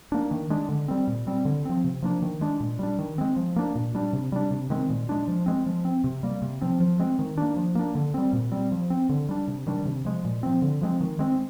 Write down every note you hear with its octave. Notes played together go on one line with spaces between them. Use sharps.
A#3 D4
D#3
G#3 D4
D3
G3 C4
A#2
G3 C4
D3
F3 C4
C3
F3 A#3 D4
D#3
G#3 D4
A#2
G3 D4
D#3
G#3 C4
F3
A#3 D4
A#2
G3 D4
C3
G3 D4
C3
D#3 G#3 C4
A#2
G#3 D4
F3
G#3 C4
F3
C4
C3
G3 A#3
C3
F3 C4
F3
G#3 C4
D#3
A#3 D4
F3
A#3 D4
D3
G3 C4
A#2
G3 C4
F3
C4
D3
G3 D4
C3
D#3 G3 D4
C3
F3 G#3
A#2
F3 C4
D3
F3 G#3 C4
D#3
G#3 C4